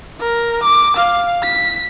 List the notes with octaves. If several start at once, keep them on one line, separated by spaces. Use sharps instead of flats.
A#4
D6
F5
B6